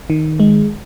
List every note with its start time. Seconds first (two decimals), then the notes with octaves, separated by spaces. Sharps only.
0.10 D#3
0.40 G#3